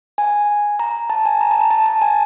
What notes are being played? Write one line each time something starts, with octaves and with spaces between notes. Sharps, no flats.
G#5
A#5
A5
G#5
A#5
A5
A#5
A5
A5
G#5